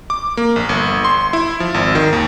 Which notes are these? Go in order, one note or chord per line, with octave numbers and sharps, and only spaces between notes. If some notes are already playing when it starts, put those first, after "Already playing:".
D6
A#3
A#1
G1
C6
E4
F3
G#1
D#3
D#2